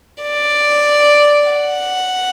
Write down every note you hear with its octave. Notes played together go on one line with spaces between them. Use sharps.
D5
F#5